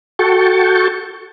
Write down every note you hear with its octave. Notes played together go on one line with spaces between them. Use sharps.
F#4 A4 G5 A5 C#6